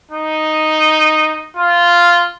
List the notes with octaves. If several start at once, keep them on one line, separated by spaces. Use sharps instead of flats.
D#4
F4